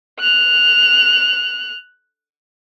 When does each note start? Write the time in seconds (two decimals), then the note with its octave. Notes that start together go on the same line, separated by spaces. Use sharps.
0.20 F#6 F7